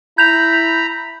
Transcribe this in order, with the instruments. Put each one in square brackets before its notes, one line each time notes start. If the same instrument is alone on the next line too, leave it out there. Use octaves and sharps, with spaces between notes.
[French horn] E4 [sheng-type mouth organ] A#5 B5 [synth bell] G6 F7